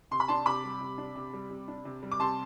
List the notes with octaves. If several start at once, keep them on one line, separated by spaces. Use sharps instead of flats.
C3 C6
B5
D4 A5 C6
C3 B5 D6
G3
C3
D4
C3
G3
C3
D4
C3
G3
D6
C3 A5 C6